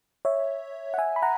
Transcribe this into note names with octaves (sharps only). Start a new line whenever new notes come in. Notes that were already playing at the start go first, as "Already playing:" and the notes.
C#5 E5
F#5
E5 G#5
B5
F#5 A#5